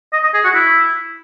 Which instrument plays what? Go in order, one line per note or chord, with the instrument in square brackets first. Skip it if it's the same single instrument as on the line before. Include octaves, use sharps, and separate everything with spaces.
[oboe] D#5
D#5
G#4
F#4
E4